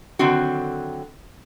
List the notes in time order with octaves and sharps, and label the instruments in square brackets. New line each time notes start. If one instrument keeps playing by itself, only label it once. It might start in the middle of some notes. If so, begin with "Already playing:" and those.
[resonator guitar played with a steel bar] D3 D#3 F#3 C4 F#4